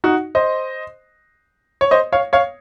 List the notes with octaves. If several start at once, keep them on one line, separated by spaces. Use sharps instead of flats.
D#4 F#4
C5 D#5
C#5
C5 D#5
C#5 F5
C#5 F5